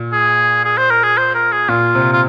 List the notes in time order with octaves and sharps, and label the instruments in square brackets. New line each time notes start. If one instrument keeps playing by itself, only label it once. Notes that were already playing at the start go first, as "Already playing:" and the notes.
Already playing: [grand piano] A#2
[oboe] G#4
G#4
C5
A#4
G#4
C5
A#4
G#4
[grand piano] A#2 [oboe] F4
[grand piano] C3
[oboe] F4